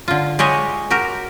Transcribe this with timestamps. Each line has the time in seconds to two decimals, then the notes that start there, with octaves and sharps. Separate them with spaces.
0.08 D3 F4
0.39 G#3 G4 C#5 D#5
0.90 F#4 G4 A#4